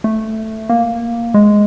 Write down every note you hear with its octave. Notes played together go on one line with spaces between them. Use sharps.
A3
A#3
G#3